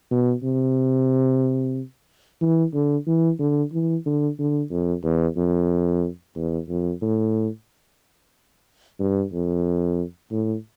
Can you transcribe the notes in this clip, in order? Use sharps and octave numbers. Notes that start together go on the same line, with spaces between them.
B2
C3
E3
D3
E3
D3
E3
D3
D3
F2
E2
F2
E2
F2
A2
G2
F2
A2